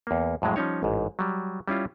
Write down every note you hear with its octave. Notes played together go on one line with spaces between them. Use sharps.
E2 A#3
F2 A2 F#3 G#3
F3 G3 C#4 D#4 C#5
A1 G#2
F#3 G3
G3 C#4 E4 F4